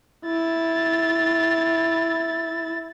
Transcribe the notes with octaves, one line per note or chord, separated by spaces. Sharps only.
E4 A6